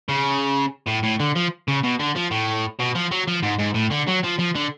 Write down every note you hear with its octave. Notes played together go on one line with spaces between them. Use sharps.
C#3
A2
A2
D3
F3
C#3
B2
D3
F3
A2
B2
F3
F#3
F3
G#2
G#2
A2
D3
F#3
F3
F3
D3